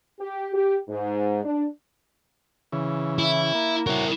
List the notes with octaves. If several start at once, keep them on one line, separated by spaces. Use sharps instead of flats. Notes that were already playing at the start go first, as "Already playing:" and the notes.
G4
G4
G#2
D4
C#3 E3
E4
A#3
E4 F#4 A#4 C#5